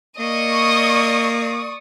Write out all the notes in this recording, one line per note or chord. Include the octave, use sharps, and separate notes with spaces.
A#3 D5 D#5 C#6 D#6